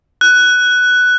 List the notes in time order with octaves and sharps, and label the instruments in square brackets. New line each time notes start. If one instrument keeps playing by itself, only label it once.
[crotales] F#6